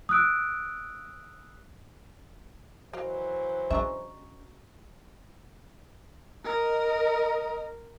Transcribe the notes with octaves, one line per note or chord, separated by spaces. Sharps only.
D#6 E6 F#6 D7
E3 F#3 F#4 A#4 C5 D#5 F5
G#3 C#4 D4 E5 A#5 C#6
A#4 D#5 A#5